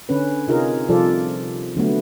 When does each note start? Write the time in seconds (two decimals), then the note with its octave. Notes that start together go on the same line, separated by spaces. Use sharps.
0.09 D3 C#4 B4
0.48 C3 D#4 F4 G#4 A#4
0.89 C3 F3 G3 F4 A4 D5
1.76 D3 F#3 A3 B3